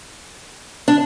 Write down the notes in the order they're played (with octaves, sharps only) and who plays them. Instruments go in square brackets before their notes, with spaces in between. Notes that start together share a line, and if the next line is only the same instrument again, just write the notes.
[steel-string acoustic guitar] D4